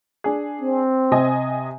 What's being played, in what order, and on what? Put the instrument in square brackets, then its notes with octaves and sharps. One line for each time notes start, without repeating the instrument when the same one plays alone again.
[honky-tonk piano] D4 G#4
[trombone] C4
[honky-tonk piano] C3 D#5 G#5